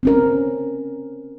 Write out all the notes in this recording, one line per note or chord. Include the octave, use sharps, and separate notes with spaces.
C4 C#4 A#4